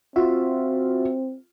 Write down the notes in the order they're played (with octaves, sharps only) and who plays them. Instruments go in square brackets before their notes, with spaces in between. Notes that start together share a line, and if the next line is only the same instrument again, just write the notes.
[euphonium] C4 [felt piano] F4 [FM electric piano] F#4 E5